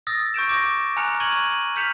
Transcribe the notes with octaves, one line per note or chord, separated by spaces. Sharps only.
D#6 E6 A6 A#6
C#6 G6 D7 E7
D6 A#6
G#5 A#5 F6 F#6 C#7 F7
C#6 G#6 D#7 F#7
F6 G6 B6 C#7 E7 F7